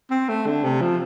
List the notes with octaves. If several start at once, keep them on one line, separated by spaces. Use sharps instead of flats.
C4
A3
D3
C3
F3